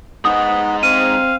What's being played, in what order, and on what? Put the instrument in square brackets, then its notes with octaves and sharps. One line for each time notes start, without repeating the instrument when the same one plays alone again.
[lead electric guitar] G#3 D#4 [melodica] B3 [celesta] D#6
[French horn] C4 [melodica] F5 [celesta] D#7